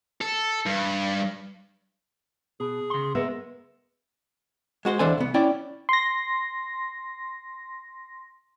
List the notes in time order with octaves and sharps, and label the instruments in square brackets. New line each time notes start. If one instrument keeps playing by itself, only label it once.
[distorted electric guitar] A4
G2
[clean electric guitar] B2 [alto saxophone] G#4
[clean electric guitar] C#3 C6
[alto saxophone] G#3 [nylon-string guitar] B3 [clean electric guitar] A#4 E5
[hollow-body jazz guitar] G#3 F#4 B4 C5
D#2 E3 D4 A4 C5 G#5
C2 B3
C#4 E4 D5 G5
[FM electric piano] C6 A#6